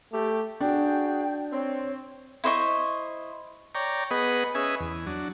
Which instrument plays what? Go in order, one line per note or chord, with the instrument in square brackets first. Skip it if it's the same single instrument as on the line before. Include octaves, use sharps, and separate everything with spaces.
[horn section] A3 G4
[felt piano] D4 [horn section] F#4 G#4 [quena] G5
[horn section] C4 [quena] C#5
[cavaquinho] E4 C5 D#5 C#6
[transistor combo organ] C#5 D5 G5 A#5
B3 G#4 B4 D#5 F#5
C#4 G#4 B4 D#5 E5 G#5
E2
F#3 D4